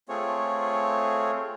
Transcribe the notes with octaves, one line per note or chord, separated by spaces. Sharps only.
A3 C4 F4 G#4 C#5